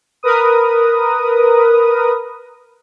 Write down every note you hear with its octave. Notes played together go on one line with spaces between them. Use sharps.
A#4 B4 D#6